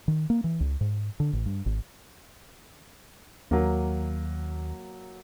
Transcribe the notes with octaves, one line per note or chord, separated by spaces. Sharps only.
D#3
A#3
E3
C#2
G#2
D3
A1
G2
G#1
D#2 F#3 A#3